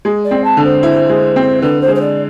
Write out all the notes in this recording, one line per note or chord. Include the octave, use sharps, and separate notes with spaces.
G#3
D5
C4
A5
D3
C5
E4
G#3
C4
D3 B4
C5
G#3
C5
D5